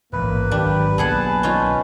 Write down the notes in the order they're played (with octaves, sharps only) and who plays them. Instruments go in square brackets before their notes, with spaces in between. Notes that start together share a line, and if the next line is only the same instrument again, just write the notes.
[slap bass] A1 G#2 [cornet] A#3 [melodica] B4
[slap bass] G#1 F#3 [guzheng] D4 [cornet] G4
[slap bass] B1 F#3 A#3 [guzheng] B3 G#4 F#5 [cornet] A5
[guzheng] C#4 D#4 F4